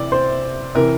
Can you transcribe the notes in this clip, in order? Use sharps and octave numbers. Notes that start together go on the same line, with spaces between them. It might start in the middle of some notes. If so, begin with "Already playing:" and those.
Already playing: C3 E3 D5
C5
C3 E3 A#4